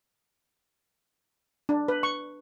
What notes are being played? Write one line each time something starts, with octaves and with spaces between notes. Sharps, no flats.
D4
B4
C#6